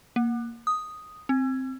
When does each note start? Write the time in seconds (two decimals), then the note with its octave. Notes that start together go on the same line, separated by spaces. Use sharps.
0.16 A#3
0.67 D#6
1.29 C4